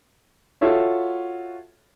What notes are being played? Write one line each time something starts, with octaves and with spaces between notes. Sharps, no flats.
F4 F#4 A4 C#5 E5